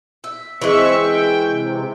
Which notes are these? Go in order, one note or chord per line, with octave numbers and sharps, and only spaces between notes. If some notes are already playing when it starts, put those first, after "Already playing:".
E5
E3 G#3 C4 E5 C#6
G5
C3